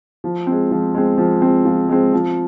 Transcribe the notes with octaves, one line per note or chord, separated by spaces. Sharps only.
F3
G#3 C4
F3
G#3 C4
F3
G#3 C4
F3
G#3 C4
F3